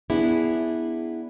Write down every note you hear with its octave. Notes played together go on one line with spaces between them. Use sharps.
B3 D4 E4 G#4